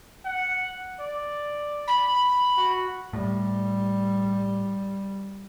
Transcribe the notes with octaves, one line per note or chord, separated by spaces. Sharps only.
F#5
D5
B5
F#4
A2 G3